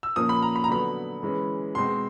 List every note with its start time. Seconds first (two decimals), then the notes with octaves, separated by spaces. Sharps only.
0.03 E6
0.16 A#2 F3 A#3 C#4 D#6
0.29 B5
0.42 A#5
0.56 B5
0.64 A#5
0.69 D3 F#3 B3 B5
1.23 E3 G#3 C#4
1.75 B2 G#3 C4 C6